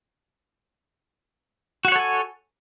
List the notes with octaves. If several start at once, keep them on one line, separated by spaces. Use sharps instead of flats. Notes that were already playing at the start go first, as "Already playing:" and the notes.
F#4 A4 C#5 F#5 G#5